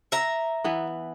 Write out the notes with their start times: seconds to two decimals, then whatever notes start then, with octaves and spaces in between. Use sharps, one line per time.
0.12 E5 A#5
0.64 E3 B3